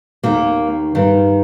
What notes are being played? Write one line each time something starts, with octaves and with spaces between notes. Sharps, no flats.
D#2 D#3 A#3
G2 D#3